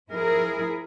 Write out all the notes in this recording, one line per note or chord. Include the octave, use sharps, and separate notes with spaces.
F3 E4 G#4 A#4